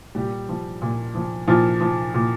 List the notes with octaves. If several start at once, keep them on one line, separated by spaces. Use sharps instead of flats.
A#2 G3 G4
F3
A#2
F3
A#2 F3 F4
F3
A#2